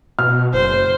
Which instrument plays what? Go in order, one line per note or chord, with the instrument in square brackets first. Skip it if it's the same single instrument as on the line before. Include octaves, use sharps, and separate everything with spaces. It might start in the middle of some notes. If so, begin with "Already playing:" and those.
[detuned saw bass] B2 [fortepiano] F6
[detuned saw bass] F#1 [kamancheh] C5